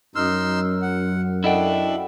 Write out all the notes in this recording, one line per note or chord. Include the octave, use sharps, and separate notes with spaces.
F#2 D#4 C6 E6 F6
F#5
D4 E4 A4 D#5 F#5 G5